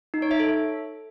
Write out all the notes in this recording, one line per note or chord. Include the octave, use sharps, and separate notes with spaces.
D#4
C#5
E5
A4